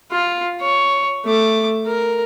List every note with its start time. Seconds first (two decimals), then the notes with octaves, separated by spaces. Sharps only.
0.12 F4
0.61 C#5
1.25 A3 D6
1.87 A#4